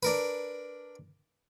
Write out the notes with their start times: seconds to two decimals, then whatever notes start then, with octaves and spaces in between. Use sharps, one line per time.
0.03 D4 A#4 B4